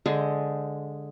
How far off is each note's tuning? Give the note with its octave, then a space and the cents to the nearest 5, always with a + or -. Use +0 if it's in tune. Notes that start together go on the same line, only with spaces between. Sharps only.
D3 -10 G#3 +0 C5 +0